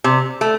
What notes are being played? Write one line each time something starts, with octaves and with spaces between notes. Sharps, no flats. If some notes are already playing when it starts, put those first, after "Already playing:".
C3
A3